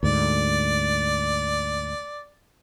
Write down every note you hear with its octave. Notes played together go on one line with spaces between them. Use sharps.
D2 G#2 D5